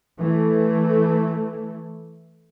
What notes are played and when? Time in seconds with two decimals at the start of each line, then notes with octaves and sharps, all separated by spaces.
0.19 E3 A3